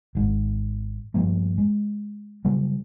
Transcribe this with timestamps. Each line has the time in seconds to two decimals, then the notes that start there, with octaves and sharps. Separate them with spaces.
0.15 G#1 G#2
1.14 G2 F3 A3 A#3
1.58 G#3
2.45 C#3 F#3 G3